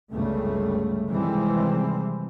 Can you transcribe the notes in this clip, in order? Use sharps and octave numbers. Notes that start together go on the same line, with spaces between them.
G1 C#2 C#3 G3 A3
C3 D#3 E3 G3 G#3 C4